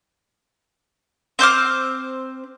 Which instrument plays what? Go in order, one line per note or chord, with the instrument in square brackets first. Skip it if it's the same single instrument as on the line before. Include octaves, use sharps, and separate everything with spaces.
[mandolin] C4 C5 D6 F6